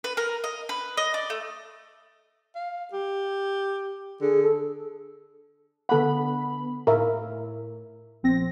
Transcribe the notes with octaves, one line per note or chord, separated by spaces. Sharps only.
B4
A#4
D#5
B4
D#5
D5
A3
F5
G4
D3 G#4
A4
D3 B3 A4 F#5 B5
A2 A#4 E5
A#1 C4 A#6